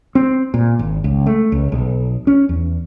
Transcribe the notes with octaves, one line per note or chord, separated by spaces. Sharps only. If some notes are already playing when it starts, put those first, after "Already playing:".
C4
A#2
G#1
C#2
A3
C#2
B1
C#4
E2